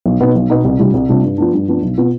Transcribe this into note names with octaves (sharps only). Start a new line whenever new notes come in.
B1
B2 B3 D#4
B1
B2 B3 D#4
C2
C3 G3 D4 F4
C2
C3 G3 D4 F4
G2
F3 B3 D4
G2
F3 B3 D4
B1
B2 B3 F4